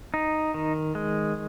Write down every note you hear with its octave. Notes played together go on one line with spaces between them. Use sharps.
D#4
D#3
G#3